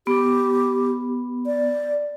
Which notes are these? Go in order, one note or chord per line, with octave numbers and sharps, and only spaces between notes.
B3 G4
D5